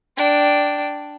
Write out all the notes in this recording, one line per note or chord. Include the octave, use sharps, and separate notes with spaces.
D4 G5